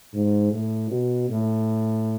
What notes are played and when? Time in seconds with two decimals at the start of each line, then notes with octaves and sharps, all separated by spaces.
0.14 G#2
0.52 A2
0.91 B2
1.30 A2